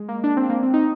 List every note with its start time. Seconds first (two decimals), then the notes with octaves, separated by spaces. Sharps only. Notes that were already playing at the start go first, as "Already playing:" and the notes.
Already playing: G#3
0.09 A#3
0.24 D4
0.37 C4
0.50 A#3
0.63 C4
0.74 D#4